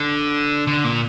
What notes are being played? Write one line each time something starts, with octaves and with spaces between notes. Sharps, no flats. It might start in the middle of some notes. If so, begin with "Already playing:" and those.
Already playing: D3
D3
A#2